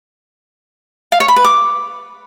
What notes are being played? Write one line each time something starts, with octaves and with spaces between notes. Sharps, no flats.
F5
C#5
B5
B4
D6